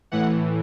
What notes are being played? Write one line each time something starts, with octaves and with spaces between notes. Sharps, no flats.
A2 E3 F#5